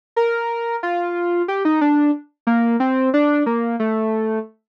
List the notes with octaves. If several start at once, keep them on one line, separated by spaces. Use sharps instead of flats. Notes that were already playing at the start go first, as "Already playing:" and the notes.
A#4
F4
G4
D#4
D4
A#3
C4
D4
A#3
A3